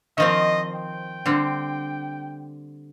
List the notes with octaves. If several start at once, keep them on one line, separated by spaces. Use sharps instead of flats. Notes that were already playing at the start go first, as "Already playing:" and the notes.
D#3 F3 C4 D#5
G5
D3 G3 C4